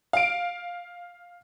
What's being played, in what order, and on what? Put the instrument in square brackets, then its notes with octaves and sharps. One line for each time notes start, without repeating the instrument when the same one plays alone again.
[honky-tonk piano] F5 D7